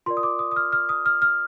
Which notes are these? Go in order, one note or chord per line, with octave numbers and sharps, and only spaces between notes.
F4 A#4 D5 C6
D#6
D6
D#6
D#6
F6
F6
D#6
F6
F6